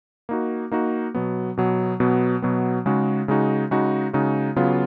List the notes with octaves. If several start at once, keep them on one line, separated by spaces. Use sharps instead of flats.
A#3 D#4 F#4
A#3 D#4 F#4
B2 F#3 B3
B2 F#3 B3
B2 F#3 B3
B2 F#3 B3
C#3 G#3 D#4 F#4
C#3 G#3 D#4 F#4
C#3 G#3 D#4 F#4
C#3 G#3 D#4 F#4
C#3 F#3 B3 F4